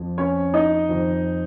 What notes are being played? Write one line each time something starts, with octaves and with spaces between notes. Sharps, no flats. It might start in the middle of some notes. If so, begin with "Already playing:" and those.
Already playing: F2 F3
C#4 C#5
D#4 D#5
F2 D#3